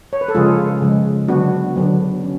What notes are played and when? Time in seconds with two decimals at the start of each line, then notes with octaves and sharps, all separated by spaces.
0.13 C#5
0.21 B4
0.28 A4
0.35 C#3 F3 G#3 F4 G#4
0.82 C#3 F3 G#3
1.28 D3 F#3 B3 D4 F#4
1.76 D3 F#3 B3 D4
2.23 C#4